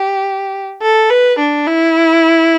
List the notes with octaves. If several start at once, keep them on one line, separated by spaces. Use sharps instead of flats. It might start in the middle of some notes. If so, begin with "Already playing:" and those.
Already playing: G4
A4
B4
D4
E4